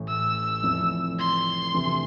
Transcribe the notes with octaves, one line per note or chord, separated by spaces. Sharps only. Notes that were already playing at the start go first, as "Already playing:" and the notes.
Already playing: A1 A2 E3
E6
F1 F2 E3
C6
D2 C3 E3